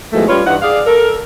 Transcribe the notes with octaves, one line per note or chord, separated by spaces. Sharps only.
E2 B2 D#3 F3 G#3 A3
G3 C#4 F4 B4 C#5
G2 E3 D#4 F#5
G#4 D5 F5
A4 A#4